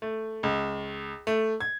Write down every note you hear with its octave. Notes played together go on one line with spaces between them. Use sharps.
A3
C#2
A3
G#6